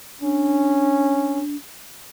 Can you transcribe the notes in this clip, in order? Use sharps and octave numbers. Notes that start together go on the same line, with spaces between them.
C#4 D4